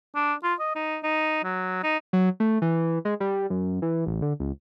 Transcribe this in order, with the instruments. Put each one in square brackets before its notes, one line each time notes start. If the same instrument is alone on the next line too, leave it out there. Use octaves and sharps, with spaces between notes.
[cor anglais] D4
F4
D#5
D#4
D#4
F#3
D#4
[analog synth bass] F#3
A3
E3
G#3
G3
F#2
E3
A1
D3
C#2